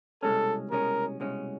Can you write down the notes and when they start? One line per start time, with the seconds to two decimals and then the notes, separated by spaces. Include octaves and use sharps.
0.23 C2 B2 G#3 C#4 A4
0.71 C2 B2 G#3 C#4 A#4
1.20 C2 B2 G#3 C#4